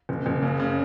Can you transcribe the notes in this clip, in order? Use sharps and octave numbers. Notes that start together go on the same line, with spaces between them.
F#1
F#1
C#3
C#3